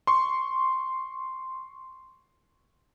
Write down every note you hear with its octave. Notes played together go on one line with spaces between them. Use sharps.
C6 C#6